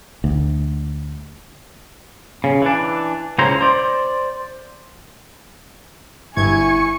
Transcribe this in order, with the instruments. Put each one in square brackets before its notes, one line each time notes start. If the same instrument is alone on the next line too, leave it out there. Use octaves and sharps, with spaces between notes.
[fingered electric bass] D2
[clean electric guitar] C#3
E3 D4
C#2 C#3 E4 C5 A#5
C5 D5
[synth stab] G1 G#6 [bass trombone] E4 [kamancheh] G#5 C#6